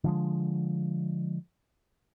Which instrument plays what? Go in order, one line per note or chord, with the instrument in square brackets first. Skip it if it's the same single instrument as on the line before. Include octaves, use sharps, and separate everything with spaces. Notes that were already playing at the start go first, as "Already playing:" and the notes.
[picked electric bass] D3 F3 G#3